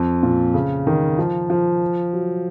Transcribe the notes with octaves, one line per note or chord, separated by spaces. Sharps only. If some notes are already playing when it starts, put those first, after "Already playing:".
Already playing: F2
A#2
C#3
D#3
F3
F3
F#3